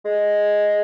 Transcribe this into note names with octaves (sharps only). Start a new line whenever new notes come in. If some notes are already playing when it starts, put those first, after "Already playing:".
G#3